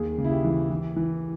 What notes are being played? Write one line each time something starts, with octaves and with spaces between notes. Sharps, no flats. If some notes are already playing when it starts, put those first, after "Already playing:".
Already playing: D#2 G#4
C#3
E4
G4
E3
E3
E3